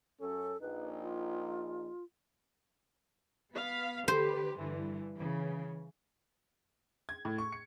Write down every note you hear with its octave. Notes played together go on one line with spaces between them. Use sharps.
F#2 C#4 A4
A#1 D#4 B4
F4
B3 F5 B6
D3 G4 B4 C5
G2 D3 E3
C#3 E3
G#6
A2
C#6
C#7